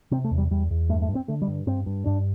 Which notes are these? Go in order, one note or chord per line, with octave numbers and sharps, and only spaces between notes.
C3 C4
A3
E2
G3
E2 G3
E2
G2 A3
A3
G2
C4
D3 A3
G3
G2
G2 C4
G2
G2 D4